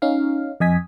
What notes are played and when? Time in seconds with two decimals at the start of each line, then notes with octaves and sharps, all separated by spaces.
0.02 C#4 D#4 F5
0.60 F2 D#5 G#5 B6